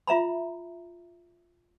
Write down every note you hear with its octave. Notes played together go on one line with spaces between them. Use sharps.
F4 E5 A#5 B5